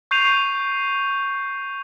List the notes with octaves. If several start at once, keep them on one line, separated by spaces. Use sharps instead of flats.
C#6 G6 C7 D#7 F7